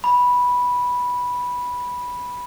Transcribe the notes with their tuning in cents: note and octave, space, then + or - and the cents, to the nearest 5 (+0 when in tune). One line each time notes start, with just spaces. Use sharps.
B5 -10